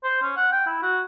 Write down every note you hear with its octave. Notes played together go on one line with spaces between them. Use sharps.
C5
C#4
F#5
G5
E4
F#4